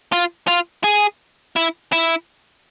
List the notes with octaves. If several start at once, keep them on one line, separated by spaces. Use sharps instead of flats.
F4
F4
G#4
E4
E4